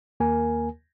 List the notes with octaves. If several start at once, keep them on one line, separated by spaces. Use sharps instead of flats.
D#2 A#3 A#4 G#5